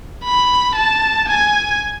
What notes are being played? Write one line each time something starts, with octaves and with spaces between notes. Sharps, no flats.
B5
A5
G#5